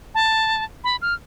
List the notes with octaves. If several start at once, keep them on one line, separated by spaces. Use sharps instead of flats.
A5
B5
F6